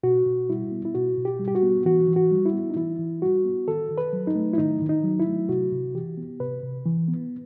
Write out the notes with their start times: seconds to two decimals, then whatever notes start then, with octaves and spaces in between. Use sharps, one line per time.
0.03 B2 F#4
0.26 B2
0.49 G3 E4
0.71 B3
0.85 E4
0.95 B2 F#4
1.17 B2
1.25 G4
1.39 G3
1.48 G4
1.55 F#4
1.63 B3
1.85 E3 F#4
2.09 E3
2.16 F#4
2.31 G3
2.46 E4
2.53 B3
2.70 D#4
2.76 E3 E4
2.99 E3
3.22 G3 F#4
3.45 B3
3.67 D#3 A4
3.91 D#3
3.98 B4
4.13 F#3
4.27 D#4
4.36 A3
4.53 E4
4.58 D#3 D#4
4.81 D#3
4.89 D#4
5.04 F#3
5.19 E4
5.27 A3
5.49 C3 F#4
5.72 C3
5.94 E3 G4
6.17 B3
6.40 C3 B4
6.63 C3
6.86 E3
7.08 B3